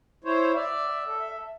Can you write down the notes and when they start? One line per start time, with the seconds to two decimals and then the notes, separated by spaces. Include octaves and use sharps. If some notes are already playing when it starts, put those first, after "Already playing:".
0.24 E4 C5 C#5
0.56 D5 E5
1.07 A4